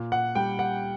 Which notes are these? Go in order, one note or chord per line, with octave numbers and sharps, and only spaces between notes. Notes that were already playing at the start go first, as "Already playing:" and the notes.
Already playing: A#2
F#5
G3 G5
F#5